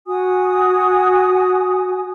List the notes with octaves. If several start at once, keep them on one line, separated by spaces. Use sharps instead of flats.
F#4 G#5 D#6